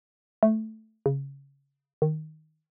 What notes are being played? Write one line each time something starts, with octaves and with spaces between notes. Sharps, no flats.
A3
C#3
D#3